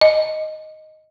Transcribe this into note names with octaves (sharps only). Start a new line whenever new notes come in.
D#5